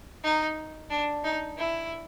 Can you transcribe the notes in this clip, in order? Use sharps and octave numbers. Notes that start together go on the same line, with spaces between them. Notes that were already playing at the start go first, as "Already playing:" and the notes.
D#4
D4
D#4
E4